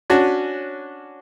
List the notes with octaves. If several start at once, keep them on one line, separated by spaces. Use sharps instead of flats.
C#4 D4 F#4